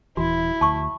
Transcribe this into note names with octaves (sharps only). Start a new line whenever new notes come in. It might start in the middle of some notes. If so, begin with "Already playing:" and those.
D#1 E3 E4 F#4
D2 A5 C#6